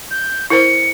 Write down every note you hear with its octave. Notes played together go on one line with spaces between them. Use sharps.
G6
E4 A#4 C5 C#7